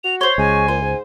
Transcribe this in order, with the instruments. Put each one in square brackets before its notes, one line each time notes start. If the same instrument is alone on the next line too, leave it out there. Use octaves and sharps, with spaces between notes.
[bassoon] F#4 [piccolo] F7
[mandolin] C5 C#5 [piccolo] G7
[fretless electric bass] C#2 [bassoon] G#3 [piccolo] G#5
[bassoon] A#2 [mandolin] C5
[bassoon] G#2